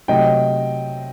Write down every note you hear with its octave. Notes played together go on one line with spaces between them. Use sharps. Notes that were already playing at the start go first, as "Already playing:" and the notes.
C3 F#3 A3 D#5 G5